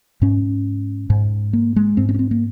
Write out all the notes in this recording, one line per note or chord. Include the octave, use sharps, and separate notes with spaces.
G#2 C#4
G#2
A#3
G#3
G#2 C4
C4
C#4
C4
A#3